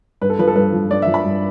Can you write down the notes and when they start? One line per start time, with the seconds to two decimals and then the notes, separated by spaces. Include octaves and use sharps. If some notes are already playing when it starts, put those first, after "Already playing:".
0.21 G2 B4
0.30 A4
0.39 F3 B4
0.48 A4
0.56 G2 B4
0.73 F3
0.91 G2 D5
1.02 F3 E5
1.14 B5
1.24 G2